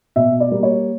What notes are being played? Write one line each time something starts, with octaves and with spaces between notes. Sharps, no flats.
B2 E5
D5
G3 A#3
C#5